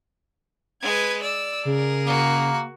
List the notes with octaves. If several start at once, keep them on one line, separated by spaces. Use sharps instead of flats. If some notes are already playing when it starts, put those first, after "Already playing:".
G#3 B4 G#6
D5 E6
C#3 G#4 A#4
A#3 F#4